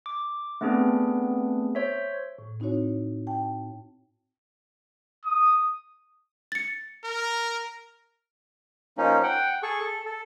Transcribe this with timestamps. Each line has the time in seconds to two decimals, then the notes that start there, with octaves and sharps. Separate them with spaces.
0.06 D6
0.61 A3 B3 C4 D4 G#4 B4
1.75 C5 C#5 E5
2.38 A2
2.60 C4 D#4 E4 F#4 C#5
3.27 G5 A5
5.25 D#6
6.52 A6 C#7
7.04 A#4
8.98 F3 A#3 C#4 D#4
9.23 F#5 G5
9.63 G#4 A4 C#6
9.80 A4
10.06 A4